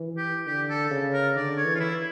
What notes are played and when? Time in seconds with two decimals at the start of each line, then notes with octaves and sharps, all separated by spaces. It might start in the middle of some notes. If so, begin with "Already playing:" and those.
Already playing: E3
0.17 G4
0.46 D3 G4
0.69 A4
0.91 C#3
1.13 A#4
1.35 D3 D5
1.57 C#5
1.64 E3
1.75 F4
1.79 E4